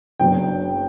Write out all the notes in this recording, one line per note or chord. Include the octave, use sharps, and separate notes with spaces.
F#1 F#2 F#3 B3 D4 G5